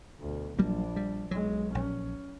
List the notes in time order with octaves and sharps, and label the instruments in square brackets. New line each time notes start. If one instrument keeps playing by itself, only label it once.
[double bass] D2 B2
[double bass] A#1 D4 [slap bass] F#3 G3 A#3
[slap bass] G3
[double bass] B1 G#3 [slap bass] F#3
[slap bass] A#1 [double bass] C#4